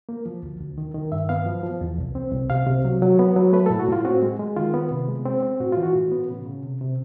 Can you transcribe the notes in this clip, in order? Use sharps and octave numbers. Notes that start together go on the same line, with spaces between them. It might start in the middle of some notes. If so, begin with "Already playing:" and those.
A#3
F3
D2
D2
D#3
D#3
G2 E5
B3 F5
F3
F3
E2
C2
C4
C2
C3 F5
C3
F#3
F#3
B3
F#3
A3 B4
A4
A2
F#4
A2 F4
C4 F#4
G#3
G#3
D#3 F4
B3
C3
G#3
C4
C4
A2 F#4
E3 F4
F#4
A2
B3
C#3
C#3
C3
C3